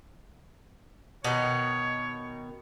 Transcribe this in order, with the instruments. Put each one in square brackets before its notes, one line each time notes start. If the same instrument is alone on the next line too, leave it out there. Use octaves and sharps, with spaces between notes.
[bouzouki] B2 D#3 [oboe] C#5